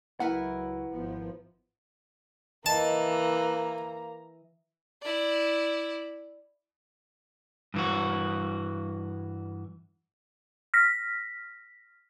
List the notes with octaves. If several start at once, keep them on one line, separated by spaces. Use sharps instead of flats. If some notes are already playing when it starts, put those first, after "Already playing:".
C#2 F#3 E4 A#4 B4 F#5
G#1 F3 B3
E3 A#3 D#5 E5 A5 A#5
E4 D5
G2 E3 F#4
F6 A#6 B6